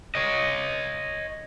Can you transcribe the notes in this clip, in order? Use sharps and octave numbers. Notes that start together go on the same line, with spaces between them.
C#5 D#5